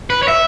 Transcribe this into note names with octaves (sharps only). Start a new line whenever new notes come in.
B4
C#5
E5